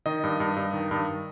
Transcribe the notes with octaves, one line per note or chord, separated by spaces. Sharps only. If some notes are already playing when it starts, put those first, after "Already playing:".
D#3 D#5
G2
G2
G2
D#3
G2